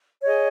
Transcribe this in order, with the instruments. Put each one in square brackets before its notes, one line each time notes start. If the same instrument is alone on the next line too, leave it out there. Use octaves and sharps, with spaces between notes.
[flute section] G#4 C#5 D#5